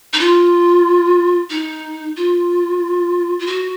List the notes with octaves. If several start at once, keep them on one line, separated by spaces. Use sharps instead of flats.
D#4
F4
D#4
F4
F4
F#4